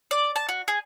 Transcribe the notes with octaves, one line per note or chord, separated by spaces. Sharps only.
D5
A5
F#4
G#4